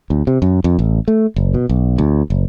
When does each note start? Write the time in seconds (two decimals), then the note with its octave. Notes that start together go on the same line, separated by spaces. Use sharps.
0.10 D2
0.27 C3
0.42 F#2
0.64 F2
0.79 A1
1.08 A3
1.36 F#1
1.54 B2
1.69 B1
1.98 D2
2.30 F#1